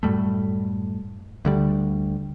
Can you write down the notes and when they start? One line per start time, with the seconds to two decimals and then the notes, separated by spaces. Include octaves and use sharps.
0.03 F#2 A2 G3 A3
1.45 D2 D3 G3